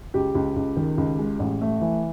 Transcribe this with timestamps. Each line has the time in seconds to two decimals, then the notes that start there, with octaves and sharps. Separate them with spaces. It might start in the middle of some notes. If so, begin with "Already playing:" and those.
0.14 C#2 G4
0.35 C#2
0.56 C#2
0.77 D#3
0.97 C#2
1.19 G#3
1.39 A1
1.62 A3
1.81 E3